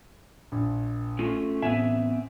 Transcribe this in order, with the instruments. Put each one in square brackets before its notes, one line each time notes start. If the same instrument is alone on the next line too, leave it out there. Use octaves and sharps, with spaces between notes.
[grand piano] A#1
[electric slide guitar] A3 C#4 F4
[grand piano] A1 G#5 E7 [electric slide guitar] B3 C4 E5